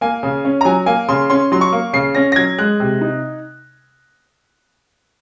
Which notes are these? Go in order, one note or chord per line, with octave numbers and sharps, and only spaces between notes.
A#3 G#5
C#3
C#4
A#5
F#3 G#5
A#3 G#5
C#3 C6
C#4 C6
F#3 C6
C#6
A#3
C#3 C7
C#4 A#6
A#6
F#3 G#6
G#3 F#6
C3
D#4